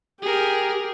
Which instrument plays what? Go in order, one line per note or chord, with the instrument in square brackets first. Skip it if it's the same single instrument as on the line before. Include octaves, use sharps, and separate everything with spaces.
[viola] G4 [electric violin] G#4 A#4